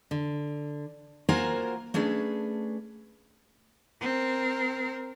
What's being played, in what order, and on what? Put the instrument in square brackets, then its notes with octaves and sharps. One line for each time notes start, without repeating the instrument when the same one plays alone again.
[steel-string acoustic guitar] D3
A#3 F4 F#4 A#4 C5 G#5
A3 C#4 D4 G#4 B4
[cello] C4 A#4